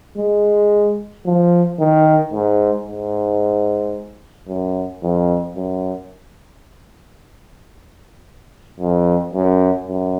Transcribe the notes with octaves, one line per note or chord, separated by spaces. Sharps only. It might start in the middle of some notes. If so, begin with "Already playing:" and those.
G#3
F3
D#3
G#2
G#2
F#2
F2
F#2
F2
F#2
F#2